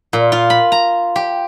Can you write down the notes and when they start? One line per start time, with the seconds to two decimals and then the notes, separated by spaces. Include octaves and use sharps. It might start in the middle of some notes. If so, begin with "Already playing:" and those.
0.13 A#2
0.32 F4
0.50 B5
0.72 A#5
1.16 G4